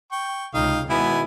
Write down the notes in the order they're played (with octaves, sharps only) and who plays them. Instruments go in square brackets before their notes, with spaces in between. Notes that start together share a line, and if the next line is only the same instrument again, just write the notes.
[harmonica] G5 C#6
[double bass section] C#2 C3 [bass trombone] D#4 [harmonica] F5 G5 D#6
[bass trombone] B2 [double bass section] D#3 G#3 [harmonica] B3 G#5 [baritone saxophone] E4